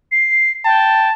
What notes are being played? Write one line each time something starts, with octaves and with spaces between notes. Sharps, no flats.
C7
G5 A5